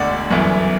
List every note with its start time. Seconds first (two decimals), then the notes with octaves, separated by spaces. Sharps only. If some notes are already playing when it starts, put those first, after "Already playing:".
Already playing: E1 D2 D3 D5 F#5
0.30 G1 F#2 E3 B3